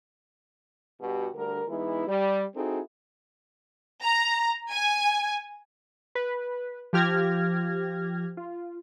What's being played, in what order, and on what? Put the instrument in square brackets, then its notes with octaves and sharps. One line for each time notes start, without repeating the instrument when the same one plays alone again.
[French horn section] G2 B2 F#4 G4
D2 D3 G3 A#4
E3 G#3 B3 D#4 E4
G3
C4 D#4 E4 F#4 G#4 A4
[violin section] A#5
G#5
[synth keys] B4
F3 G4 F6 G#6 A#6
F4